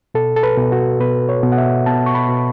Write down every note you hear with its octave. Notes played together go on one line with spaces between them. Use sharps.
B2 A4
A4
B4
B2
F#4
B2 B4
C#5
B2
F#5
E5
B3 A5
C#6
B5
B2